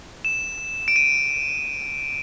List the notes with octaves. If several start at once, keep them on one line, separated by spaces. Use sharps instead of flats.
E7
D7
D#7